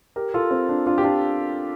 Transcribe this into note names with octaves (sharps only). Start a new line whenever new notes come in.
G4 A#4
F4 A4
C4
D4
D4 F4
G4
D4 F4